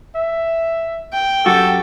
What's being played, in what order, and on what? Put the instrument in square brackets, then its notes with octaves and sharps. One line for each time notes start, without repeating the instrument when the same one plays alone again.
[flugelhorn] E5
[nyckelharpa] G5
[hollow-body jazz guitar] F#2 F#4 [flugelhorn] G4 [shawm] A4